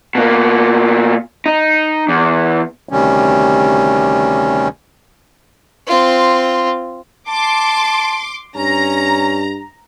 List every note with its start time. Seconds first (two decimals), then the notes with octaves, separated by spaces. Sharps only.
0.15 B2 A#3
1.46 D#4
2.09 E2
2.89 D2 C3 D#3 G3 C#4
5.87 C4 F4
7.28 A5 C6 D6
8.56 G2 C#4 A#5